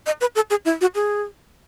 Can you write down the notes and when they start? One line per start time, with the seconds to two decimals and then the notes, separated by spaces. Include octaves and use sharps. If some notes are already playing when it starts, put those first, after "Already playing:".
0.06 D#5
0.21 B4
0.35 A4
0.50 G#4
0.65 E4
0.81 F#4
0.95 G#4